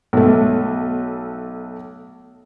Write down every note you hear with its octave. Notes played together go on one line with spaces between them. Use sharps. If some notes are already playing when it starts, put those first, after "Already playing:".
B1 A3